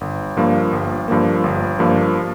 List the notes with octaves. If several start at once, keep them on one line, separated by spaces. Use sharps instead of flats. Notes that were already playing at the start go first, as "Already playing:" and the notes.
G1
G2 F3 A#3
G1
G2 F3 A#3
G1
G2 F3 A#3